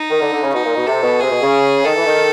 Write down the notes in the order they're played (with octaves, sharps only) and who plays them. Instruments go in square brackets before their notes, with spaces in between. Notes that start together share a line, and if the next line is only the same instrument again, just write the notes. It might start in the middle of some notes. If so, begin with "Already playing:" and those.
Already playing: [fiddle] D#4
[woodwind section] D#3
D3
D3
C#3
[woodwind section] B2 [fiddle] D#4
[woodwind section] A#2
B2
[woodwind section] C3 [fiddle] A4
[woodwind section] B2
[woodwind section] C3 [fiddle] G#4
[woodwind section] B2
C#3
[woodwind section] D#3 [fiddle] A4
[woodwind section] E3
D#3